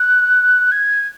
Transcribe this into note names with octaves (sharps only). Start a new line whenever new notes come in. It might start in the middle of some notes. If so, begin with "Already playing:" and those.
Already playing: F#6
G#6